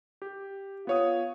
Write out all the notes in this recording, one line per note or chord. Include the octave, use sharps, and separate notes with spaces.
G4
B3 F4 C#5 D#6